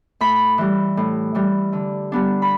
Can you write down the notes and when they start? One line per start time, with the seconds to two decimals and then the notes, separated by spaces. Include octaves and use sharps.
0.21 A2 B5
0.58 E3 G3
0.97 A2
1.35 E3 G3
1.73 D3
2.12 G3 B3 D4
2.42 B5